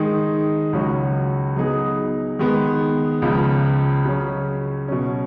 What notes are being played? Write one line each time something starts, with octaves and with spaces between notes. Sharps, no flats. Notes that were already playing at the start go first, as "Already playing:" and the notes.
Already playing: D#3 G#3 D#4
C#2 C#3 F#3 C#4 F#4
F#3 B3 D#4 G#4
D#3 G#3 B3
C#2 C#3 F3
C#3 F#3 C#4
B2 F#3 C#4